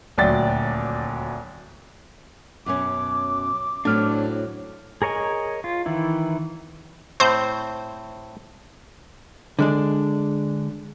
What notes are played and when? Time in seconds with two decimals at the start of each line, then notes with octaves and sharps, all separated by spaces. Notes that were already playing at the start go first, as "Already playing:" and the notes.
0.17 D#1 D2 F#3 D5 G5 A6
2.66 F#2 B2 C#4 D6
3.85 A2 F#3 C4 D4 F6
5.02 G#4 A#4 C#5 D#5 G#5
5.64 F4
5.86 D#3 E3 E4
7.20 A2 C4 C5 G6
9.59 D3 G#3 D4